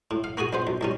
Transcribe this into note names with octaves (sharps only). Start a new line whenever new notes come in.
A2
F5
A#3 F#4 G#4 G#5
A#1 B3 C5
B1
C2 G3 C#4